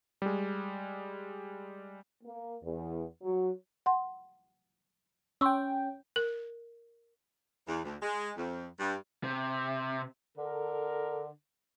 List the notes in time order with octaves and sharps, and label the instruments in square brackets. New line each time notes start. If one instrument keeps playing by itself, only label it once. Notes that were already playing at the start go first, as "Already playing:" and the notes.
[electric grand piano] G3 G#3
[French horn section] A#3
E2
F#3
[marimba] F#5 C6
[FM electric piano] C#4 G5 [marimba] C6 C#6 E6
[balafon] A#4
[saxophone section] E2
D2
G#3
F2
G2
[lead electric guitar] C3
[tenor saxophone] D3 [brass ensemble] A4 A#4